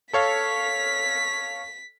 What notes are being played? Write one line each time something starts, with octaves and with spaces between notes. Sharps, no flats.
A4 C#5 F5 B6